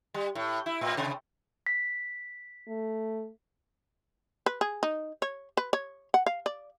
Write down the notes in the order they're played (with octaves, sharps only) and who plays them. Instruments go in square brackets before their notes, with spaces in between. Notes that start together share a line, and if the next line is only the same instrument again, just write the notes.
[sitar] G3
A2
E4
A2
C3
[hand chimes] B6
[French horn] A3
[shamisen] B4
G#4
D#4
C#5
B4
C#5
F#5
F5
D5